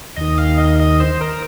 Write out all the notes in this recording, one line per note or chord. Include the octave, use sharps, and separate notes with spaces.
D#2 D#3 D#5
F5
D#5
D#5
C5
A#4